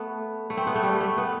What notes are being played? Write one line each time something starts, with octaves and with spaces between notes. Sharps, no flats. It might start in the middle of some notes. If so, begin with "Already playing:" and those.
Already playing: A3 B3
A3
C4
B3
A3
G3
A3
B3